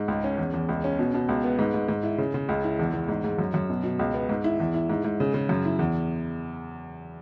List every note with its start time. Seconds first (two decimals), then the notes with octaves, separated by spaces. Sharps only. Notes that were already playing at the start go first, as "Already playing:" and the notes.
Already playing: G#2
0.08 C#2
0.24 C#4
0.38 E2
0.54 E2
0.69 C#2
0.84 C#4
0.99 B2
1.14 B2
1.29 C#2
1.44 B3
1.59 G#2
1.74 G#2
1.89 G#2
2.03 E4
2.18 C#3
2.34 C#3
2.49 C#2
2.64 E4
2.79 E2
2.93 E2
3.08 G#2
3.24 G#2
3.39 F#2
3.54 F#2
3.70 B2
3.84 B2
3.99 C#2
4.14 B3
4.29 G#2
4.44 E4
4.60 E2
4.74 E4
4.90 G#2
5.05 G#2
5.20 C#3
5.34 C#3
5.49 F#2
5.65 E4
5.79 E2